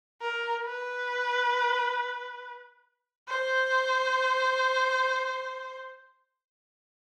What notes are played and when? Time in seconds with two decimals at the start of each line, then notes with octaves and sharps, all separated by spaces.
0.21 A#4
0.65 B4
3.29 C5